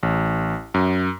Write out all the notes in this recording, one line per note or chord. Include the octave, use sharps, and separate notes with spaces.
A1
F#2